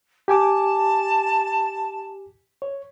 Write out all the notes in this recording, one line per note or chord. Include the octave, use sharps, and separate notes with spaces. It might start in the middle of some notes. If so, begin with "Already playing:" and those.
G4 G#5 A5 D6
C#5